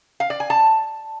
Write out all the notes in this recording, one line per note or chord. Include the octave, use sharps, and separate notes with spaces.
F5
D5
G#5
A5